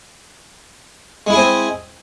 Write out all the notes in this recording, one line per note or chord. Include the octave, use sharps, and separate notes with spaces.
G#3 C4 E4 G#4